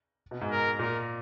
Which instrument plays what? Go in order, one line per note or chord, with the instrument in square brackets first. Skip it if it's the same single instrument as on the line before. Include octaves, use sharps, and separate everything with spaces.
[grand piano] B2
G#2
[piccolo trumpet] A#4
[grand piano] A#2 [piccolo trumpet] A#4